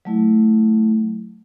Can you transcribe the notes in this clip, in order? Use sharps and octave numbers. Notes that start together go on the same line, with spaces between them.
F#3 A3 E4